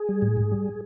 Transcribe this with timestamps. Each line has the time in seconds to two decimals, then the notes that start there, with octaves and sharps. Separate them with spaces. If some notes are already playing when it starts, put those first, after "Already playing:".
Already playing: G#4
0.09 G3
0.22 A2
0.37 G#2
0.52 G3